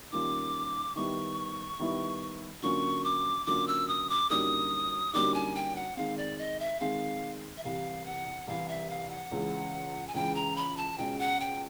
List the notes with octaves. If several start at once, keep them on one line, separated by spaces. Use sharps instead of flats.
D#3 G3 A#3 C#4 F4 D6
D#3 G3 B3 E4 C#6
D#3 G3 B3 E4
D3 F#3 A#3 C#4 F4 C#6
D6
D3 F#3 A#3 C#4 F4 D6
E6
D#6
D6
F#2 D3 G3 A#3 D#4 D#6
F#2 D3 G3 A#3 D#4 D6
G#5
G5
F#5
D#3 G#3 C4 F5
D5
D#5
E5
D#3 G#3 C4 F5
E5
C2 C3 E3 F5
F#5
C2 C3 E3 F5
E5
F5
F#5
C#2 C#3 E3
G#5
C#2 C#3 E3 G5
A#5
B5
A5
C#2 B2 G#3 C#4 G5
F#5
G5